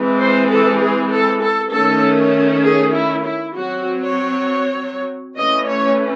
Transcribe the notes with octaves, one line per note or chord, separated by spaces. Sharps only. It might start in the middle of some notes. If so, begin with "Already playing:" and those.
Already playing: E3 G#3 C4
C5
A4
G#4
A4
A4
D#3 A3 C#4 A4
G#4
E4
E4
F#3 C4 F#4
C#5
E3 A3 C#4 D#5
C#5